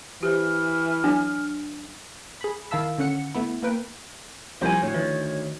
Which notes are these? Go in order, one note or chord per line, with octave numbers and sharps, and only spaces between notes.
E3 G4 C5 F6
F#3 D4 G#5
G#4 B5
D#3 E4 F5 A5 E6 B6
D3 C#4 F#5 C#7
A3 B3 E4
A#3 A#4 B4 G5
C2 F3 G3 A#3 C5 G#5
D2 A2 C#5
D#3 E3